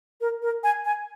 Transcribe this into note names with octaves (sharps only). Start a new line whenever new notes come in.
A#4
A#4
G#5
G#5